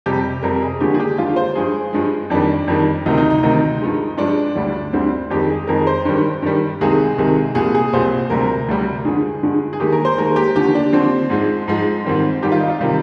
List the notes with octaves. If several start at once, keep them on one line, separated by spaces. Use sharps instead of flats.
F2 C3 G3 G4
F2 C3 G3 A#4
G#4
D#2 D3 F3 G#3 G4
G#4
G4
D#2 D3 F3 G#3 F4
C5
G2 F3 G#3 G#4
G2 F3 G#3
F2 D#3 G3 D4
F2 D#3 G3
D2 C3 D#3 D#4
D#4
D#4
D2 C3 D#3 D#4
G2 F3 G#3
G2 F3 G#3 D4
D2 D3 G3
D2 D3 G3 C4
F2 D#3 G#3 G4
G#4
F2 D#3 G#3 A#4
C5
G2 D#3 G3
G2 D#3 G3
C2 C3 D#3 G#3 G#4
C2 C3 D#3 G#3
C2 A#2 F3 G#4
G#4
C2 A#2 F3 C5
D2 C3 G3 A#4
D2 C3 G3
G2 D3 F3 G#3 G#4
G2 D3 F3 G#3
G#4
D#2 D#3 G#3 G4
A#4
C5
D#2 D#3 G#3 A#4
G4
D#2 D3 F3 G4
D4
D#2 D3 F3 C4
G#2 F3 G#3
G#2 F3 G#3
G#2 D#3 G3 C4
G#2 D#3 G3 G4
F4
D#4
F4
C3 D#3 G3